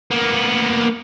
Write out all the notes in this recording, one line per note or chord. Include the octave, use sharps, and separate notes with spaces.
A#3 B3